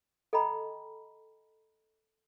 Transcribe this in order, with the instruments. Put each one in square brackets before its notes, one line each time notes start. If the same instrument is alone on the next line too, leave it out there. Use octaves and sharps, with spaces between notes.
[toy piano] A4 D#5 G5 A#5 B5